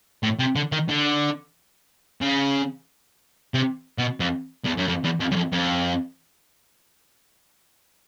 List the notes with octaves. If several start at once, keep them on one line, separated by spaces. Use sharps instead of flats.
A2
C3
D3
D#3
D3
C#3
C3
B2
F2
E2
F#2
F2
E2
F2
F#2
F2
F2